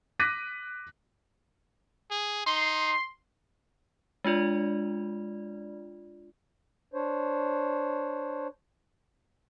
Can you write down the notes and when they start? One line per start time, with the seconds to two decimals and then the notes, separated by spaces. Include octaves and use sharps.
0.19 D6 F#6 A#6 B6 D#7
2.11 G#4
2.46 D#4 C6
4.24 G#3 D4 F4 D5
6.94 D4 C5 C#5